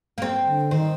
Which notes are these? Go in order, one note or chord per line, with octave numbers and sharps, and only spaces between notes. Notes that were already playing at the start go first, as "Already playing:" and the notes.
A#3
C4
D3
D#3 C4